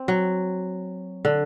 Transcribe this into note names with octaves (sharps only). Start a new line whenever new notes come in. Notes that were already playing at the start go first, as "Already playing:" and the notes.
Already playing: C4
F#3
D3